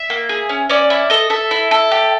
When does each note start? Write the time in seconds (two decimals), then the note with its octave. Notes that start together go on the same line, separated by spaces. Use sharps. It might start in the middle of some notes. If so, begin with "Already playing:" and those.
Already playing: E5
0.10 A#3
0.29 G#4
0.49 C#4
0.70 C#4 D5
0.90 E4
1.10 A4 D#5
1.30 A4 E5
1.51 E4
1.71 A4
1.91 G4